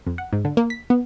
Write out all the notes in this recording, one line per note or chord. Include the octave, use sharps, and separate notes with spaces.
F2
F#5
G#2
D3
A#3
B6
B3